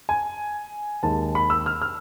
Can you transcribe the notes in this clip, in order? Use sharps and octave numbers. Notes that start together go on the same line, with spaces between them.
G#5
D#2 D#3 G#3 A5
B5
E6
F6
F6